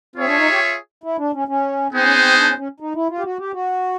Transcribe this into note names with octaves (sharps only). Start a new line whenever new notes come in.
C4 F4 G#4 C#5 E5
D4
D#4
G4
E4
D4
C#4
C#4
B3 C4 D#4 G#4 C5
C#4
C4
D4
C#4
C#4
D#4
E4
F4
G4
F#4
G4
F#4